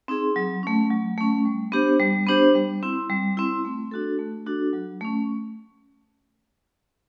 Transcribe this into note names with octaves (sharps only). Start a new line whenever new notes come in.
C4 D#4 G#4
F#3
A3 C#4
F#3
A3 C#4
G3
B3 D4 G4 C5
G3
B3 D4 G4 C5
G3
C4 E4
G3
C4 E4
A3
D4 F#4 A4
A3
D4 F#4 A4
F#3
A3 C#4